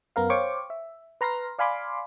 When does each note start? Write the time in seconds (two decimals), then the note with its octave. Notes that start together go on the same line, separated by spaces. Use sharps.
0.16 F#2 B3 A#4 F5
0.30 C5 C#5 F5 G5 C#6 D6
0.70 E5
1.21 B4 A#5 C6 F6 A#6
1.59 D5 F5 G#5 B5 C6 D6